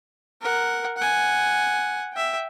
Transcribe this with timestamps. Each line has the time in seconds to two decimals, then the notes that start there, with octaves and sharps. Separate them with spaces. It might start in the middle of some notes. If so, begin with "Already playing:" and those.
0.42 A#4 F#5
0.98 F#5 G#5
2.13 E5 G5